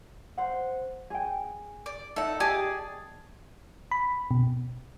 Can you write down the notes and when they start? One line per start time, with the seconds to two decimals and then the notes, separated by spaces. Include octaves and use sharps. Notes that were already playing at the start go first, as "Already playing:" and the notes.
0.37 C5 F#5
1.10 G#4 G5
1.86 D5
2.16 D#4 A4 E5 F#5
2.40 G4 G#4 D5 D#5 A5
3.91 B5
4.31 B2